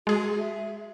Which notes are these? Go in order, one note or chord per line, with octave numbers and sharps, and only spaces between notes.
G#3 F#4 G#4
E5